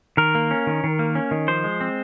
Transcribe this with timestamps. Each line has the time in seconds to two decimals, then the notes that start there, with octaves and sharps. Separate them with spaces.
0.17 D#3 A#4
0.35 A#3
0.51 C#4
0.67 D#3
0.84 D#3
0.99 A#3
1.15 C#4
1.31 D#3
1.48 F3 C5
1.64 G#3
1.81 C4